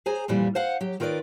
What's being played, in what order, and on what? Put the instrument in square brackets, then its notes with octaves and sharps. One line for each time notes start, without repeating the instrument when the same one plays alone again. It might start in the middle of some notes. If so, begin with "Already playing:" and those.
[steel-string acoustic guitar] G#4 C5 G#5 A#5
F2 A#2 E3 G3
C5 F5 F#5
F#3 G4
D#3 F4 A#4 B4 D5